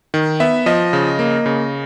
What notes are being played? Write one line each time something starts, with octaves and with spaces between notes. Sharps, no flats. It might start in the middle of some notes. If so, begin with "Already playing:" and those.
D#3
B3 E5
F3 D#5
C#3
A#3
C#3